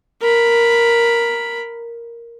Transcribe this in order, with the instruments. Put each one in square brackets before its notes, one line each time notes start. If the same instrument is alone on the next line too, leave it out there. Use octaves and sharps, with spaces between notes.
[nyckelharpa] A#4 B5